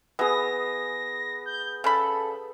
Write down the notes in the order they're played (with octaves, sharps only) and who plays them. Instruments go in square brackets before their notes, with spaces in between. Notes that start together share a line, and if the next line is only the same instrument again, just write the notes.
[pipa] E3 [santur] B3 G#4 [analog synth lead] A#6
[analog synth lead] G6
[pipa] C#3 B5 [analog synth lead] A4